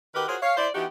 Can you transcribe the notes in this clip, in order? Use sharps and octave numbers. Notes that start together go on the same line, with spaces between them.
D#3 F#4 G4 A#4 B4
F4 F#4 G#4 A#4 C5 C#5
C#5 F5
E4 C5 D5
E3 B3 D#4 F#4 G4